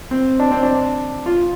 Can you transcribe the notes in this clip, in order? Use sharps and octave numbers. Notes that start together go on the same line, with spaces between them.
C4
D4
C4
D4
F4